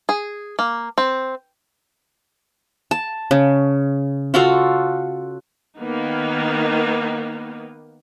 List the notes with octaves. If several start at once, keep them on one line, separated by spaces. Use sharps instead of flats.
G#4
A#3
C4
A5
C#3
F4 F#4 A4 F5
D#3 A#3 B3 D#4